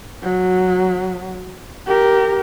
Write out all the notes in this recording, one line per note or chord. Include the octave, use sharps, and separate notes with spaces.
F#3
G4 A#4